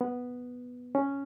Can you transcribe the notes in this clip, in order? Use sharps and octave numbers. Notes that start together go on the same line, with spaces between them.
B3
C#4